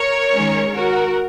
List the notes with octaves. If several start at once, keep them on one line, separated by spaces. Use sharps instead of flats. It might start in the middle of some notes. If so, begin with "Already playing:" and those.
Already playing: A#4 C#5
D#3 G#3 C#4
F#4 A#4